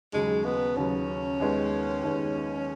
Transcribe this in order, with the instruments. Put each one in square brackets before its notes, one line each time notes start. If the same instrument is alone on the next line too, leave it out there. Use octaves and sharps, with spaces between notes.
[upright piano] D#2 C#3 F#3 [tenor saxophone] G#3
[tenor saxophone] B3
[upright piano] D#2 C#3 F#3 [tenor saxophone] C#4
[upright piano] D#2 D#3 G#3 B3
D#2 D#3 G#3 B3